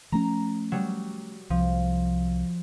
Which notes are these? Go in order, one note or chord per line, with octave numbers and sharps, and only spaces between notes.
F3 A3 C#4 A#5
F#3 G3
C2 F3